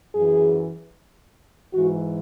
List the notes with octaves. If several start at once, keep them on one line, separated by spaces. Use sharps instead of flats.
F#2 E3 G#4
G#2 E3 F#4